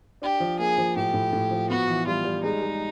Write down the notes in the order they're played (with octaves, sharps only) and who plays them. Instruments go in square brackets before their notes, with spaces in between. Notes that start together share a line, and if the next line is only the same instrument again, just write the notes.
[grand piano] D4 [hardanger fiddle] G4
[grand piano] F3
[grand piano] A#3 [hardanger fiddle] G#4
[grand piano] F3
[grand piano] A2 [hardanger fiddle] G4
[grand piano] A2
A2
F3
[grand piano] B3 [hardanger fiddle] F#4
[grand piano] E3
[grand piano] G3 [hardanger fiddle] F4
[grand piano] G3
[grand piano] G#3 [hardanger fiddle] D#4
[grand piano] G#3